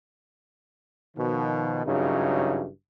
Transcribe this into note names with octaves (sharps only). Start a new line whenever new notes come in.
B2 D#3 F3
G#1 G2 C#3 F#3 D#4 E4